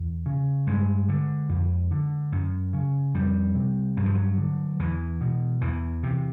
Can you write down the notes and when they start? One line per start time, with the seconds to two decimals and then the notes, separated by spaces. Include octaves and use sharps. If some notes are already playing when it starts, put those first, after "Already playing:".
Already playing: E2
0.26 C#3
0.67 G2 G#3
1.09 D3
1.49 F2
1.91 D3
2.32 F#2
2.73 C#3
3.14 F2 G3
3.55 C3
3.97 G2 F#3
4.06 F3
4.15 F#3
4.38 D3
4.79 E2 E3
5.21 B2
5.61 E2 E3
6.03 C3